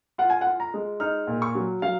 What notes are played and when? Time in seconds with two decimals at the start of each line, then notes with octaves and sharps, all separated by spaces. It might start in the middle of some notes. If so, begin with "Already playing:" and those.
0.18 F4 F#5
0.30 G#5
0.41 F#5
0.46 F4
0.60 A#5
0.74 G#3
1.00 D#4 F6
1.27 A#2
1.42 C#6
1.55 F#3
1.82 F#3 F5